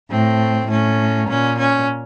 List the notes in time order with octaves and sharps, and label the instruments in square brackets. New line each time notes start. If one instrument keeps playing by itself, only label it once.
[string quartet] A2 [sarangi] C4
[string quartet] A2 [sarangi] C#4
[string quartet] A#2 [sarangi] C#4
[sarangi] C#4